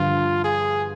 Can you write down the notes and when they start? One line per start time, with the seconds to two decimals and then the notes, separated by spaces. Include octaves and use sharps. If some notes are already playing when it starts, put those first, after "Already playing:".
Already playing: G2 D3 F3 F4
0.44 G#4